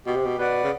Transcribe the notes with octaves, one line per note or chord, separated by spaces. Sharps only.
B2 G4
C3
B2
B2 B4 D5 F#5
C#3